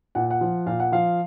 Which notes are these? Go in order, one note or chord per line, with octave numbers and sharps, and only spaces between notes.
A#2 F#5
F#5
F3
A#2 F5
F#5
F3 F5